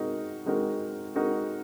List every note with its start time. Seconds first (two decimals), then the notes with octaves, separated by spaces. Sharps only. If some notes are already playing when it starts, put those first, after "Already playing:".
Already playing: G#3 C4 D#4 F#4 A#4
0.46 G#3 C4 D#4 F#4 A#4
1.15 G#3 C4 D#4 F#4 A#4